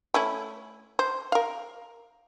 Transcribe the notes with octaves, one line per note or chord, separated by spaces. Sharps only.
A3 C#4 E4
C5
A#4 F5